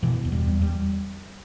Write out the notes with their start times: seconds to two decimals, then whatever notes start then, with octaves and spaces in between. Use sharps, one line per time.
0.03 B2 E3
0.25 E2
0.32 G3
0.47 E2
0.62 G3